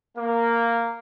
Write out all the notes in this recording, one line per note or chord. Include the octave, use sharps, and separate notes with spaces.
A#3